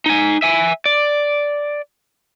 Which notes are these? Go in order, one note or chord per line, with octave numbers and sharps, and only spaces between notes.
D#4 G#5
E5 G#5
D5